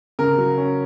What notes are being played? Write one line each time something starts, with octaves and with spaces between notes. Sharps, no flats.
C#3 A#4
F#3
C#4